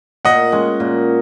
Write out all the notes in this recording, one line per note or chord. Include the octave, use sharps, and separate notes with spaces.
A#2 D#5 F#5
G#3 C#4
A#2